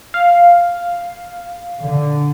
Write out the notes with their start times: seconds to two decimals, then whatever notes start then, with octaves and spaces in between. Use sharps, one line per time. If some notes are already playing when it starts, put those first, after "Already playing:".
0.14 F5
1.83 D3